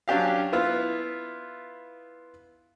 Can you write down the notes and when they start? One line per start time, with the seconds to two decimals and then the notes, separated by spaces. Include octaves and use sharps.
0.08 F#3 C#4 D4 G4 F5
0.53 B3 E4 F4